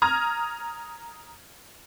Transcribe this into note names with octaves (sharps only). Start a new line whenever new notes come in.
A#5 D#6 F6 G#6